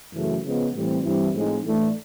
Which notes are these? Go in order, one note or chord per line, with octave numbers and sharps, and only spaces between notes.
F#2 C#3 E3 A3
C#3 F3 G#3 B3
A2 E3 G3 C4
G2 E3 G3 C4 E4
A2 F3 G#3 C4 D#4
A2 E3 A3 D4